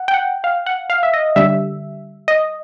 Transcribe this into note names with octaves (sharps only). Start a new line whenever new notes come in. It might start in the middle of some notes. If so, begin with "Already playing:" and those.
Already playing: F#5
G5
F#5
F5
F#5
F5
E5
D#5
D3 G3 E5
D#5